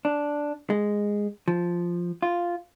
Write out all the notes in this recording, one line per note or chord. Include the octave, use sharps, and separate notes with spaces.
D4
G#3
F3
F4